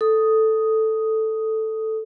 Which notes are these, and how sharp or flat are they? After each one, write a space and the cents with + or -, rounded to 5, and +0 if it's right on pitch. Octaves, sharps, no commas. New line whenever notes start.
A4 +0 D#6 +0